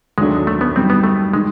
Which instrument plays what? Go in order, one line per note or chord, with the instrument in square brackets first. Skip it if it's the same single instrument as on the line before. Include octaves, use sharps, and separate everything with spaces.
[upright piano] D#2 D3 F#3 A3 D4 [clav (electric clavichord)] G#3
[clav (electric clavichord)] A3
B3
[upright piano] F#2 D#3 G3 [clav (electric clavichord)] C4
[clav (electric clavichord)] B3
A3
[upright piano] D#3 [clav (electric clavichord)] G#3